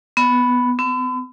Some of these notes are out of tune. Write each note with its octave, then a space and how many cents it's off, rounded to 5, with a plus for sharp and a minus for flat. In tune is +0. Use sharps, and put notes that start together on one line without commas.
B3 +5
B3 +45